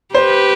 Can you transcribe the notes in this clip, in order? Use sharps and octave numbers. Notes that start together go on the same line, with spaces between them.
G4 B4 C5